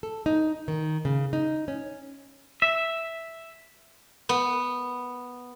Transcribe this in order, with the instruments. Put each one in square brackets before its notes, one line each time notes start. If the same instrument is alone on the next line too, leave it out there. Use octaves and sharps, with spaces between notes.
[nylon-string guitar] A4
D#4
D#3
C#3
D#4
C#4
[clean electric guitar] E5
[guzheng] B3